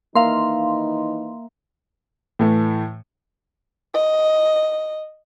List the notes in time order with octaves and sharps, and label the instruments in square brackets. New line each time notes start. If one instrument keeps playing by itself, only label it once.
[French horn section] D#3 E3 D#4 [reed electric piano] A#3 E5 A#5 [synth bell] F5 C6
[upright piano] A2 E3 A3
[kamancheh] D#5